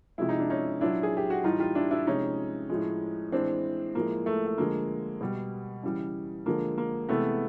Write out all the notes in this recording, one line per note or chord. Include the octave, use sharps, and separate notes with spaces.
C3 F3 G#3 E4
D#4
D4
C#4 D#4
A#2 F#3 D4 E4
G#4
G4
F#4
A2 E3 G3 D#4 F4
F4 G4
D4 E4
D4 E4
C3 F3 G#3 C#4 D#4
A2 F3 G#3
A2 E3 G#3 C4 D4
A2 F3 G#3 A#3
A3
A3
D3 F3 G#3 A#3
B2 G3
C#3 E3 G3
D3 F3 G#3 A#3
A#3
C3 E3 G#3 A3 B3